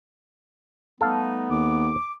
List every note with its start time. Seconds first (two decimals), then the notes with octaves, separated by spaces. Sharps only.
1.01 G3 A3 B3 D#4 A4 F5
1.50 D#2 D6